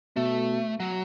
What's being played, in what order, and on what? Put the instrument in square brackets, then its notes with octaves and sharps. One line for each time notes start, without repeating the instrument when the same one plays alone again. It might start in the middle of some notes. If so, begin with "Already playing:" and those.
[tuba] B2 [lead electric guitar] A3
[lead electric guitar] F#3